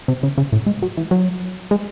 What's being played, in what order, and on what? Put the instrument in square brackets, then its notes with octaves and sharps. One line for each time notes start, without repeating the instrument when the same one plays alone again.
[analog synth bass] C3
C#3
C#3
A2
G#3
F#3
E3
F#3
G#3